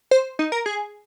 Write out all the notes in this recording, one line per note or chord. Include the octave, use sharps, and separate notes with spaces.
C5
D#4
A#4
G#4